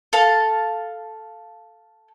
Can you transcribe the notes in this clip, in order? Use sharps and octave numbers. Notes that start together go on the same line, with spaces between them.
A4 F5 A5